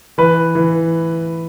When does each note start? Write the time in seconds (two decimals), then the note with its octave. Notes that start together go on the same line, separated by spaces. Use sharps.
0.18 E3 B4
0.55 E3